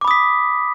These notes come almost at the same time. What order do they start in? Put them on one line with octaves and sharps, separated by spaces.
D6 B5 D#6 B6